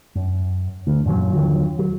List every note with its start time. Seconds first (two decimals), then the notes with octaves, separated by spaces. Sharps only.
0.15 F#2
0.87 D2
1.05 F#2 A#2 E3 F#3
1.33 D#2 D3 F3 F#3
1.79 F#3